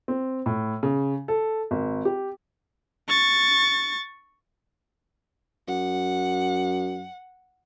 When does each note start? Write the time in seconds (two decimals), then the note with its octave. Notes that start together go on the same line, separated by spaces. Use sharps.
0.08 C4
0.46 A2
0.83 C#3
1.28 A4
1.71 G#1
2.05 G4
3.09 C#6 A6
5.68 F#2 F#5